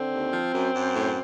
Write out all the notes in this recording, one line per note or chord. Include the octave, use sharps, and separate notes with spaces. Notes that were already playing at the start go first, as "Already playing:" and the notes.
Already playing: D3 C4
D#2
F3
F#2
F#2
A2